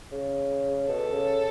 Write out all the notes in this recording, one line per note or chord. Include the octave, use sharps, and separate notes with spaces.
C#3
B2 A4
C#3